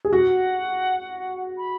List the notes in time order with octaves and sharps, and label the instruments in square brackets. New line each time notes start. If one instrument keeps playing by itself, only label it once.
[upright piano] G#4
[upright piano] F#4 [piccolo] F#5
[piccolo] B5